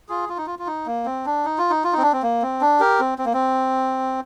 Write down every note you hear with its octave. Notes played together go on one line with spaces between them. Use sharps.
F4 G#4
F4
D#4
F4
F4
D#4
A#3
C4
D4
D#4
F4
D#4
F4
C4 D#4
D4
C4
A#3
C4
D4
G4 A#4
C4
C4
A#3
C4